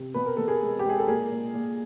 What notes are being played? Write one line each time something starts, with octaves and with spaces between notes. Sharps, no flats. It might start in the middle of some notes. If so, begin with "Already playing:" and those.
Already playing: C3
B2 B4
A#4
B2 A4
G#4 A#4
G#3
G4
G#3
G#4
A4
A#2 G#4 A#4
A#2
A#2